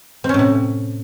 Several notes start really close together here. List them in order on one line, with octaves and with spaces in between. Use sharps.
C4 C#4 A2 C3